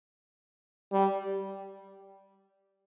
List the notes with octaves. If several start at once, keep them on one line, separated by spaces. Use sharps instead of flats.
G3